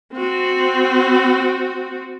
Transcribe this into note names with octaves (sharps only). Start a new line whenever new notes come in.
C4 F#4